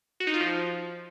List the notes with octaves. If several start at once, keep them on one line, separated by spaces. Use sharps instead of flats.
F#4
D#4
F4
F3